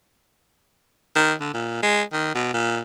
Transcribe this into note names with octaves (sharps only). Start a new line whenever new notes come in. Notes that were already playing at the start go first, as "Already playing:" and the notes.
D#3
D3
A#2
G#3
D#3
B2
A#2